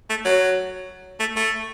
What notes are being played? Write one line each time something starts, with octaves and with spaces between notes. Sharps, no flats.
A3
F#3
A3
A3